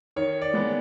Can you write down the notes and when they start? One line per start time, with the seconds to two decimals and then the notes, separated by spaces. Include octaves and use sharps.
0.16 D#3 C#5
0.42 D5
0.54 G#3 B3